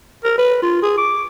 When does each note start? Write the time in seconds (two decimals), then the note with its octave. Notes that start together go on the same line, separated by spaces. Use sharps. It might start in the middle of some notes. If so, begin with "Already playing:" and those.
0.24 A#4
0.38 B4
0.62 F4
0.82 G#4
0.98 D6